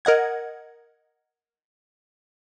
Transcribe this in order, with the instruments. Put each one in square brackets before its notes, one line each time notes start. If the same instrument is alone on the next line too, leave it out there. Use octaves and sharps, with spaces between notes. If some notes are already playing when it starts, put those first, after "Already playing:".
[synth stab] A#4 D#5 F#5 G#6